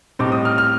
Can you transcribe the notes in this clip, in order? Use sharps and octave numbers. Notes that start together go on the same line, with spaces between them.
A2 G3 C4 D#4 D6
D#6
F6
F6